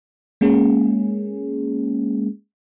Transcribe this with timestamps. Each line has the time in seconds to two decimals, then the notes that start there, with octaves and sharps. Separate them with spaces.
0.41 G#3 A#3 C#4 G#4